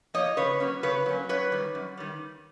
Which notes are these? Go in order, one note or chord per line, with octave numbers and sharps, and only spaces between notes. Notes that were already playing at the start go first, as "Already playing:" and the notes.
F3 A#3 C#5 D#5
C#3 B4 C#5
F#3 A#3 C#4
C#3 B4 C#5
F#3 A#3 C#4
F#2 B4 C#5
D#3 G3
F#2
D#3 G3